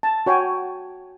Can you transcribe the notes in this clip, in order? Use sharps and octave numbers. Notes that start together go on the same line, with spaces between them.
A5
F#4 C#5 G5 G#5